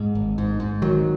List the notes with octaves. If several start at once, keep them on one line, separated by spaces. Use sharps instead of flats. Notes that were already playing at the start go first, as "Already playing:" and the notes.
Already playing: G#2
G#1
G#2
G#2
G#1 D#3 F#3